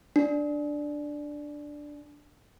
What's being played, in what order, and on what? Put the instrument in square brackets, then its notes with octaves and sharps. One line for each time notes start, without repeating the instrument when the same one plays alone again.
[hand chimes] D4